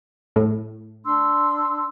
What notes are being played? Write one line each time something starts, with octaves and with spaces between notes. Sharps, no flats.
A2
D4 C6 E6